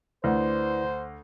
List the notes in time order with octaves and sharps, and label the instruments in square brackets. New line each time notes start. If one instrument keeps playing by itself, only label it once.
[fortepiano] D2 [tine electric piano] E4 B4 D5 [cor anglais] C5